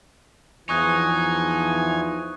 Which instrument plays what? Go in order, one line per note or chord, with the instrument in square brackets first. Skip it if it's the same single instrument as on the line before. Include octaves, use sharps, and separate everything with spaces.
[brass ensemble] E2 E3 F3 [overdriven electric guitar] D#4 [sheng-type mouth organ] G#5 [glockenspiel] C#6 D#6 F#6